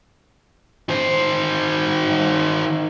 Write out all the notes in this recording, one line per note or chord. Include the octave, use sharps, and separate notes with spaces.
D#3 C5